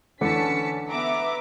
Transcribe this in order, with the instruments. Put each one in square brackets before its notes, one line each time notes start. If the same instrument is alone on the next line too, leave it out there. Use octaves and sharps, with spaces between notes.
[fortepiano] D3 E3 D4 [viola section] C#4 [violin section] A5 B6 C#7
[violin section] B3 A#5 D6 [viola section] E5